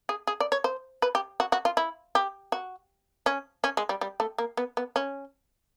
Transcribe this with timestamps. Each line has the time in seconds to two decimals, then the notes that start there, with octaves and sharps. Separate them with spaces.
0.09 G#4
0.27 G#4
0.40 D5
0.52 C#5
0.64 C5
1.02 B4
1.15 G4
1.40 F#4
1.52 F#4
1.65 F4
1.77 E4
2.15 G4
2.52 F#4
3.26 C#4
3.64 C#4
3.77 G#3
3.89 G3
4.01 G3
4.20 A3
4.38 A#3
4.57 B3
4.77 B3
4.96 C#4